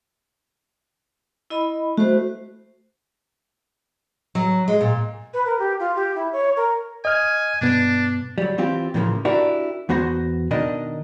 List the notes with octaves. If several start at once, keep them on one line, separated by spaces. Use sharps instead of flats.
E4 D#5 B5
A3 F#4 C5
F#3
G#3
A#2
B4
A#4
G4
F4
G4
E4
C#5
A#4
D#5 G#5 F6
G2 B2 B3 D4
F#3 G3
E3 C4 F4 G4
A2 C#3 E3 F3 A3 A#3
D4 E4 F#4 G4 A#4 D5
E2 B3 F#4 C5 A#5
B2 D#3 D4 A#4 D#5